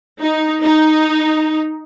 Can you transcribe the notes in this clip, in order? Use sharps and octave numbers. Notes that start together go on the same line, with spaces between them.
D#4
D#4